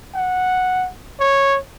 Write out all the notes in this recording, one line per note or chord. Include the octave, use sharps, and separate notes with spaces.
F#5
C#5